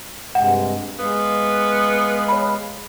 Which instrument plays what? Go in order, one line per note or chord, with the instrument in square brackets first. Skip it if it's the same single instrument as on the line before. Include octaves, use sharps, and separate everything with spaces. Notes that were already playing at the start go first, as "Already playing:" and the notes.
[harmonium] G2 C3 G#3 [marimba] F#5
[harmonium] G#3 F5 [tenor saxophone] B3
[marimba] C#5 B5